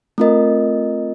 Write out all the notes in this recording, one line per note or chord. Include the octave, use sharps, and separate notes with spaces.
A3 C4 F4 A#4 D#5